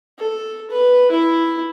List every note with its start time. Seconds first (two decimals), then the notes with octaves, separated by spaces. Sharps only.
0.19 A4
0.70 B4
1.11 E4